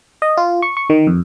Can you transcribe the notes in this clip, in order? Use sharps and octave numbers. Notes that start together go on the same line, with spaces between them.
D#5
F4
C#6
C#6
D#3
F2